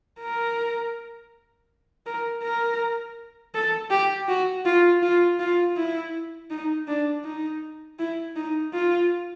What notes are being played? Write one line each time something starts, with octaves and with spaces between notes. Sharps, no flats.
A#4
A#4
A#4
A4
G4
F#4
F4
F4
F4
E4
D#4
D4
D#4
E4
D#4
F4